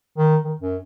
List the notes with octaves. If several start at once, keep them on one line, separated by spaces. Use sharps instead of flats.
D#3
D#3
F#2